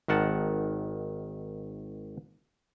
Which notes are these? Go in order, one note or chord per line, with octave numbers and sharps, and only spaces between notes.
G#1 D#3 F#5 A5